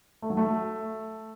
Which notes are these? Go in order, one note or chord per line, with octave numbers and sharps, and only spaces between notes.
A3
F#3
A3